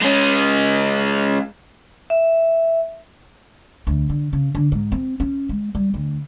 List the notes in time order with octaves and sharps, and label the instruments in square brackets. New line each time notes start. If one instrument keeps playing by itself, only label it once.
[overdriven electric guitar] G#3 C#4
[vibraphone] E5
[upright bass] D2
D3
C#3
D3
G#2
C4
C#4
G#3
G3
D2